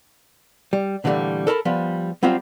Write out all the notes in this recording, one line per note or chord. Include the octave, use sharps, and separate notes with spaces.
G3
A#2 D3 E3 F3 G3 A3
A4 A#4 A5 B5
F3 G3 B3
F#3 G3 C4 F4 G4 C5